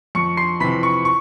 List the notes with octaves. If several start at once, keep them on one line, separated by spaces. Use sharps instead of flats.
F2 C#6 C#7
C6 C7
C3 E3 B5 B6
C#6 C#7
C#6